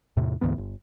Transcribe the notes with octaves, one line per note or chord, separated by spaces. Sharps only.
E2 A2 C3
D2 G#2 E3 B3
G1